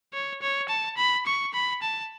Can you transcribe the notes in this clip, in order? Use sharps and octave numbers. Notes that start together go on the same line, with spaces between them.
C#5
C#5
A5
B5
C#6
B5
A5